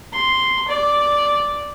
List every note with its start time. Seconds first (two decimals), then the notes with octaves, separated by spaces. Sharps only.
0.13 C6
0.68 D5